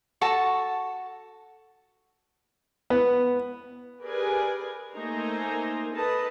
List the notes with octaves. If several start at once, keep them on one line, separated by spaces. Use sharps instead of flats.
F#4 A4 A5 C#6
B3
G4 G#4 A#4 B4 D5 G#5
A3 A#3 D#4 C5 G#5 A#5
A4 B4 D#5 A5 A#5